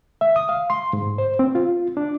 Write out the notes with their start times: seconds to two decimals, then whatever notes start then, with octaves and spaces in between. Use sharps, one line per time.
0.21 E5
0.36 D#6
0.49 F5
0.70 C6
0.93 G#2
1.18 C5
1.39 C4
1.55 F4
1.97 D4